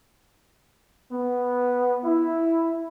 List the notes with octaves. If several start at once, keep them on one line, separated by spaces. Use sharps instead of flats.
B3
E4